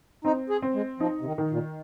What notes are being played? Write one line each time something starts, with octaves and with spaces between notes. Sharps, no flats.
C4 D#4
G#4
C4
G#3
F3 D#4
C3
D#3
D#3
A#2